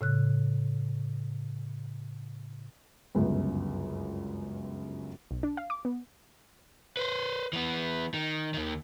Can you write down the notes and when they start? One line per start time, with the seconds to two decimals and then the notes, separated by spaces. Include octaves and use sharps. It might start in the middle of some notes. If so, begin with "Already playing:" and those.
0.01 A2 C#3 F#6
3.15 G1 C#2 F#2
5.31 B1
5.43 D4
5.57 F5
5.70 D6
5.85 B3
6.97 B4 C5
7.53 E3 B3
8.14 D#3
8.54 D#2 D#3